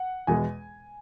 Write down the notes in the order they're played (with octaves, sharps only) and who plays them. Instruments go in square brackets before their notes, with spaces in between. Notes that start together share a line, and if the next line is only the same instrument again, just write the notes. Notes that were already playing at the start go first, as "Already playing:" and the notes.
Already playing: [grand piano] F#5
E2 B2 G#3 G#5